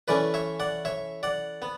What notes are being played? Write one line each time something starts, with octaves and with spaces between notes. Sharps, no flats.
E3 A3 C#4 B4 D5
C#5 E5
D5 F#5
C#5 E5
D5 F#5
B3